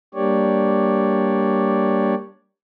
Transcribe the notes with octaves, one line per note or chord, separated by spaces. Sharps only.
G3 A#3 D4 G4 C#5 D5